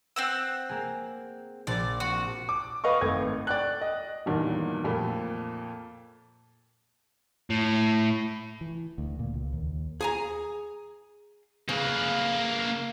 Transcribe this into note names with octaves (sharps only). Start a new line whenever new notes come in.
C4 F#5 E6
A#3 G#4
A#1 D5 A6
C4 F#4
D6
B4 D#5 F5 C#6
G#1 A3 G#6
D5 G5 F#6
D#5
E2 G2 A#2 D3 D#3 F#3
F2 A#2 A3 B5
A2
E3
D2
A#2
C#2
D#2
G#4 G#5 A#5
C#3 A#3 B4